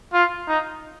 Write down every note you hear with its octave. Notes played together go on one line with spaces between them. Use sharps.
F4
D#4